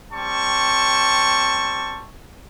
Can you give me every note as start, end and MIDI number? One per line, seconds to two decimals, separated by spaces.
0.13 2.06 55
0.13 2.06 60
0.13 2.06 81
0.13 2.06 85